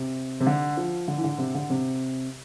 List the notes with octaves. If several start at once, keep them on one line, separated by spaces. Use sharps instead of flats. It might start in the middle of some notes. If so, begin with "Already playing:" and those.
Already playing: C3
C3
D3
F3
D3
E3
D3
C3
D3
C3